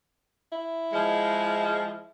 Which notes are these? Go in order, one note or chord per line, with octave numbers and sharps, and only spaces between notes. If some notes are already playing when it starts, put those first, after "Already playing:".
E4
F3 G#3